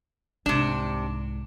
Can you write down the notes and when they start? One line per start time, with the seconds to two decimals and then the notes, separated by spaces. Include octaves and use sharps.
0.46 C2 G#2 C3 D4